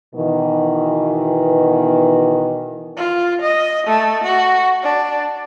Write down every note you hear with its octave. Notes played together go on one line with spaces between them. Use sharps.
B2 D#3 E3
F4
D#5
A3
F#4
D4